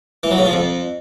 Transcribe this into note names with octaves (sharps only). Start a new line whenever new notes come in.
E3
F#3
C#3
F3
F2